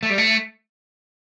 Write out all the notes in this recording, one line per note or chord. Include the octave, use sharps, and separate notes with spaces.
A3
G3
A3